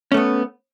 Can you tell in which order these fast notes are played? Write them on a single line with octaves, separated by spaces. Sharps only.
C#4 A3 B3